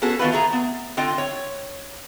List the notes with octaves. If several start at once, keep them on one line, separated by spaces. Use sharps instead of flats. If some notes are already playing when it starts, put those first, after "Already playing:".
B3 C#4 F#4 G#4 A4
D#3 B3 F4 F#4 B4
A3 G#4 A#5
B3
D3 C4 F4 D#5 G5
C#5